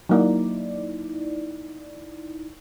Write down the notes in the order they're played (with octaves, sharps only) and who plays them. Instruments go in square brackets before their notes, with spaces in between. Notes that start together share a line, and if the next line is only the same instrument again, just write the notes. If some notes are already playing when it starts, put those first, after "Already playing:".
[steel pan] F#3 A#3 [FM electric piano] D#4 E4 D5